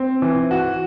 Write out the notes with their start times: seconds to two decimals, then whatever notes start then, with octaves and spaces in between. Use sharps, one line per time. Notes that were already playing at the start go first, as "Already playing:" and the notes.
Already playing: C4
0.22 E3
0.51 F#4